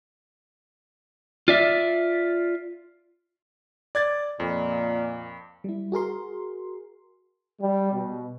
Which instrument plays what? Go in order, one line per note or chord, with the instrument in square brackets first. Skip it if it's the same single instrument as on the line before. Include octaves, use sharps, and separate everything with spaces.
[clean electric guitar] F4 D5 E5
[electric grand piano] D5 G#6 A6
[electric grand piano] F2 [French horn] A#2
[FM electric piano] G3 E4
F#4 G#4 A#4 C6
[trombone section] G3
B2